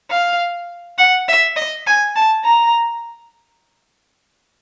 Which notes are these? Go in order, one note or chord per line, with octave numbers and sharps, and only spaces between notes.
F5
F#5
E5
D#5
G#5
A5
A#5